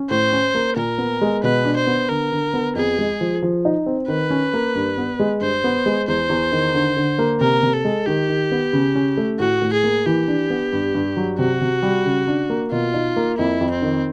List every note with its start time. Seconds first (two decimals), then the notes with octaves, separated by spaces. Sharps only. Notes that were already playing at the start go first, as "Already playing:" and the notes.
Already playing: C#4
0.10 A2 C5
0.32 C#4
0.55 A#3
0.76 A#2 A#4
0.98 B3
1.21 G#3
1.43 B2 B4
1.65 D4
1.76 C5
1.87 B3
2.09 D3 A#4
2.32 D3
2.54 B3
2.75 F2 G#4
2.99 G#3
3.21 F3
3.43 F3
3.65 D#4
3.86 C4
4.08 D#3 B4
4.31 C#4
4.54 A#3
4.75 G2
4.98 B3
5.19 G#3
5.41 G2 C5
5.64 B3
5.86 G#3
6.08 E2 C5
6.29 E2
6.52 D#3
6.74 D3
6.97 D3
7.19 A#3
7.40 C3 A#4
7.63 C3
7.74 A4
7.85 G#3
8.07 D#3 G4
8.29 D#3
8.52 B3
8.73 C#3
8.95 C#4
9.17 A3
9.39 A2 F#4
9.62 A2
9.73 G#4
9.84 A#3
10.06 E3 G4
10.28 D4
10.50 B3
10.73 G2
10.95 G2
11.17 F#3
11.39 C3 F#4
11.61 C3
11.83 G3
12.06 C#3
12.28 D4
12.50 A#3
12.72 B2 F4
12.94 D#4
13.16 A#3
13.38 F2 E4
13.61 F2
13.71 C4
13.82 D#3